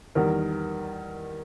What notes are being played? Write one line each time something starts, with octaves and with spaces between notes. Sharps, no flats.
E2 D#3 G3 A#4